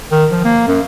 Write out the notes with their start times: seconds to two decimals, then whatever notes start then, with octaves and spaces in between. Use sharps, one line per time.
0.12 D#3
0.31 F3
0.45 A#3
0.67 F#2